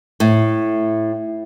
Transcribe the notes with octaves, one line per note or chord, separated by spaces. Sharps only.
A2